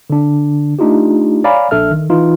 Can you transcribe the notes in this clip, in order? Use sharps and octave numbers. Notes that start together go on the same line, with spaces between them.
D3 D4
A3 D4 D#4 F4 G4
C#5 D5 F5 G#5 A#5 B5
A#1 D4 A4 E5 F6
D#3
E3 D#4 F4